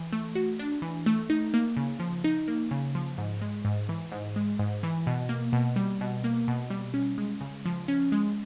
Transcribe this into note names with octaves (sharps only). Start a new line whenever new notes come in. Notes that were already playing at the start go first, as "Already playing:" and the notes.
Already playing: E3
A3
F#4
D4
E3
A3
D#4
A#3
C#3
F3
D#4
A#3
C#3
F3
G#2
G#3
G#2
E3
G#2
G#3
G#2
E3
B2
A#3
B2
G3
B2
A#3
B2
G3
C#4
G#3
C#3
F3
C#4
G#3